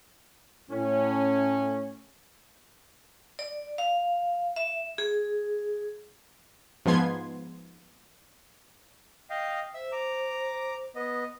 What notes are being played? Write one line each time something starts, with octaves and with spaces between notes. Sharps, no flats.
A2 C#4
D5
F5
E5
G#4
G#2 F3 B3 C6 G#6
D#5 F5 G5
C5 E5 E6
A#5 D6
B3 D#5